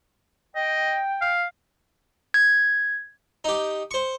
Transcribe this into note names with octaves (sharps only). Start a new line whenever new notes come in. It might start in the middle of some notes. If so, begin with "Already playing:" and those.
D#5 G5
F5
G#6
D#4 G4
C5 C#6